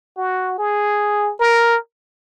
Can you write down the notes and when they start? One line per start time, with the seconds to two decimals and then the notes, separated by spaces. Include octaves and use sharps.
0.18 F#4
0.59 G#4
1.40 A#4